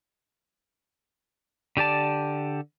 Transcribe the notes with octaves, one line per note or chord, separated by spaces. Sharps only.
D3 G4 D5 A5